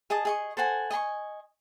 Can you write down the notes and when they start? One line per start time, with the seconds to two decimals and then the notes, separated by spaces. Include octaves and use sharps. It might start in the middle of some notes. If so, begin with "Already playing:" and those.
0.10 G#4 D#5 A5 D#6
0.25 G#4 D#5 C#6
0.57 A4 C5 F#5 G#5
0.90 D#5 G#5 B5 C#6